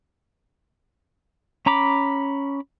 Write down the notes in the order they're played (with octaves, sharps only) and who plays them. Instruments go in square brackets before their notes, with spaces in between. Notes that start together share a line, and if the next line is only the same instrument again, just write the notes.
[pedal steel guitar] C#4 A#5 B5 D6